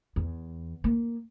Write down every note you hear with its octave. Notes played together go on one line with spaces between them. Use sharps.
E2
A#3